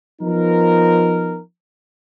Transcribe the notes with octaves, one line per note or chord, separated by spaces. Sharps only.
F3 B3 D#4 A#4